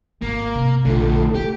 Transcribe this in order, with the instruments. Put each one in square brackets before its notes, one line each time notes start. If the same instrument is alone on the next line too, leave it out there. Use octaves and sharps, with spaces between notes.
[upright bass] G#1 [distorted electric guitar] A#3
[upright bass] C3
[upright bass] A#1 [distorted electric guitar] D3 F3 [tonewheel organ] A3
[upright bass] D3 [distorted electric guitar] G4